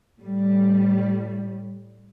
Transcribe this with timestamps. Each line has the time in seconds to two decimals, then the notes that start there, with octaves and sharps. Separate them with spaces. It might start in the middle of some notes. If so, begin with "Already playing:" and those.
0.22 A2 G3